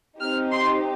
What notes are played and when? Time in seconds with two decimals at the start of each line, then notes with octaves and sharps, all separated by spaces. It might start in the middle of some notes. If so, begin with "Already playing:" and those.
0.20 C4 D#4 G4 F6
0.52 C6